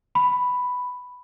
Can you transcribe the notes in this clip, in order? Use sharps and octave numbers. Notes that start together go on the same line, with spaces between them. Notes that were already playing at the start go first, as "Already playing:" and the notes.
B5